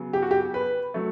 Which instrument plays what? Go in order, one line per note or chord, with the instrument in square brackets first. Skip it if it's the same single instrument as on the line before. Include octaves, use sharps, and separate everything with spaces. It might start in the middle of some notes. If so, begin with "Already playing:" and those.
Already playing: [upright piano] C#3 F#3 B3
G4
F#4
G4
B4
F#3 A3